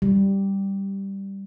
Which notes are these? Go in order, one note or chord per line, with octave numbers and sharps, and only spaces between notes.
G3